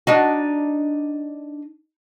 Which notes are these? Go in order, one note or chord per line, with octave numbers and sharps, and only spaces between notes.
D4 D#4 F#4